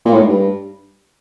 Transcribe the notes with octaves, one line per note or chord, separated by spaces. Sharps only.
A#2
A2
G#2
G2